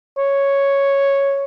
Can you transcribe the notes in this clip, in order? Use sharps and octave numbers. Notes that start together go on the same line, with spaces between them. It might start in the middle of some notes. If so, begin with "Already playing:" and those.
C#5